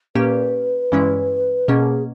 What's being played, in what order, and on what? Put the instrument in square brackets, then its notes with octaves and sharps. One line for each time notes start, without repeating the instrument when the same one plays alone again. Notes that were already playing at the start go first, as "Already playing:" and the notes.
[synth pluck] A#2 A#3 C#4 G4 [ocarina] B4
[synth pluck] G2 E3 G#3 C#4 E4
[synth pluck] B2 A#3 C#4 [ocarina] G#4